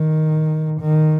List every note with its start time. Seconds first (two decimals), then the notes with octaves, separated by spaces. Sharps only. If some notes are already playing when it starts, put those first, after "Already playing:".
Already playing: D#3
0.80 D#3